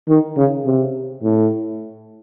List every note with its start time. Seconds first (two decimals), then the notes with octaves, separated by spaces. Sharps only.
0.09 D#3
0.37 C#3
0.65 C3
1.23 A2